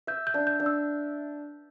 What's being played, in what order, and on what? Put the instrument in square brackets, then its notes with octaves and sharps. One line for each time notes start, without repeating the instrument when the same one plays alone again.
[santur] E5 [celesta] G6
[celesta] G6
[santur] D4
[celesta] G6
[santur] D4
[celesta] E6